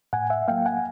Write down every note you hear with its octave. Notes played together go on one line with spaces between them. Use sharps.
A2 F#5 G#5
E5 F#5
F#3 A#3 F5 G5
F#5 G#5